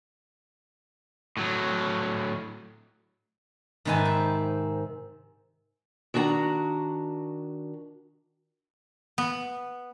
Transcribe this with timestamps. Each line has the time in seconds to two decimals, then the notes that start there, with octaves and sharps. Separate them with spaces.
1.37 A2 F#3
3.85 G#2 C3 D#3 B4 G#5 A5
4.05 C4
6.14 D#3 D4 F#4 G#5 A#5
9.18 B3